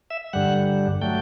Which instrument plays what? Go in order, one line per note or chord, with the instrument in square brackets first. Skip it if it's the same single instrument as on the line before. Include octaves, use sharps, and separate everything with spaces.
[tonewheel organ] E5
G2 D3 G3 F#5
F#3 A3 G5